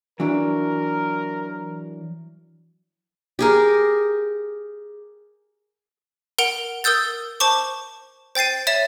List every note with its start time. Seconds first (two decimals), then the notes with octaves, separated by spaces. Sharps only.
0.20 E3 F#3 D4 A#4
3.39 G4 G#4 A#4
6.38 A#4 F#5 D7 F7 G7
6.84 A#4 D#6 E6 G6 A6
7.40 C5 A5 C#6 D6
8.35 C5 G5 A6 C7 D#7
8.67 C#5 E5 A6 E7